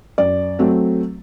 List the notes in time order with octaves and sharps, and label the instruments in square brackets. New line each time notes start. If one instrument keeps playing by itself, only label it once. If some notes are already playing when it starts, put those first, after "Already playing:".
[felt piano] F#2 D5
F#3 A3 C4